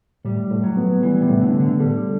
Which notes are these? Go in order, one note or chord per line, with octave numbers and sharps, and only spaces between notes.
A2 G3
A2
F#3
B3
E3 G3
C3
A2
D3
A2
D3
G3 A4